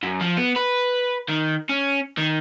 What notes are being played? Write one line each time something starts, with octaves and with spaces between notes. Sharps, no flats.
F#2
F3
B3
B4
D#3
C#4
D#3